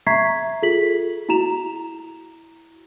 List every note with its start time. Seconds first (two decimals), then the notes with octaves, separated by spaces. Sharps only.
0.06 E5 A#5 C#6 G#6 B6 C7
0.62 F4 G#4 A4 B6 F#7
1.29 E4 F#4 A#5 E7 F7